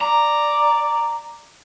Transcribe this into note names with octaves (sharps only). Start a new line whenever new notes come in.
D5 A#5